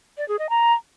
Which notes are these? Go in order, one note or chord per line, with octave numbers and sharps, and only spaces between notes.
D5
G#4
D#5
A#5